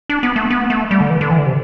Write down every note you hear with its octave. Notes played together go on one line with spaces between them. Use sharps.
D4
B3
A3
B3
A3
G3
D3
E3
D3
E3
D3
C3